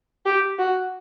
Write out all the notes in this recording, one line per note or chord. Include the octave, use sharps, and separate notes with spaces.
G4
F#4